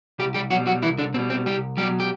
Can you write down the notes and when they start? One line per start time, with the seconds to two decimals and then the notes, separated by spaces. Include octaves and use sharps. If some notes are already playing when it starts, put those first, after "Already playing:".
0.19 C2 G3 G4
0.34 G3 G4
0.51 B2 F#3 G3 F#4
0.67 F#3 F#4
0.82 C2 E3 E4
0.98 D3 D4
1.14 B2 C4
1.19 G3
1.30 C4
1.46 C2 G3 G4
1.77 B2 F#3 G3 G4
2.00 G4